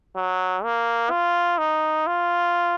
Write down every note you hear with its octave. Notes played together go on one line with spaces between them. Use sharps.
F#3
A#3
F4
D#4
F4